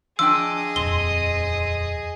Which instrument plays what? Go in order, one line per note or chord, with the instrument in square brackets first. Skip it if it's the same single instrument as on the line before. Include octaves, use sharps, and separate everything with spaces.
[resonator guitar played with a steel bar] F3 D4 G5 [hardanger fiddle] G#4 D#5 [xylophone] E6
[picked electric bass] D#1 F2 [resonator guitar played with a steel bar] C4 [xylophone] G7